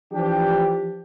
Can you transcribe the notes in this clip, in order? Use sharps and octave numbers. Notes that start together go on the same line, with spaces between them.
E3 F3 D4 G4